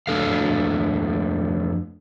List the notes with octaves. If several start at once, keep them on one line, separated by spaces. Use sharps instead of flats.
F2 A3 D4 A4 F5